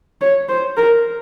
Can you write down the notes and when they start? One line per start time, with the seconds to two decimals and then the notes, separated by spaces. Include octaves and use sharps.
0.21 C#5
0.49 C5
0.77 A#4